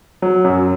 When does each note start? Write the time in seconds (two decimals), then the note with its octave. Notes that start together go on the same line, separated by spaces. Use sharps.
0.22 F#3
0.44 F#2